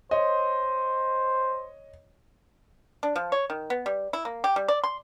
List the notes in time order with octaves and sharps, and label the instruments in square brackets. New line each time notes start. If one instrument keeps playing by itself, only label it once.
[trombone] C5 [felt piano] C#5 D#5
[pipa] D4
F3
C#5
D#3
B3
G3
E4
A#3
G4
G3
D5
C6